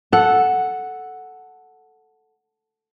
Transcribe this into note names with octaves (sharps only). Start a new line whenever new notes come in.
A4 F#5